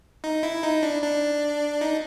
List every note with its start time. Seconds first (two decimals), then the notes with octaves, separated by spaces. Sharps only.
0.24 D#4
0.43 E4
0.63 D#4
0.83 D4
1.03 D4
1.81 D#4